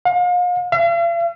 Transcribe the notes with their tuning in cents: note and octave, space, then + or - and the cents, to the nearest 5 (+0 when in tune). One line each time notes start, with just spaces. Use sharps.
F5 +40
F5 -45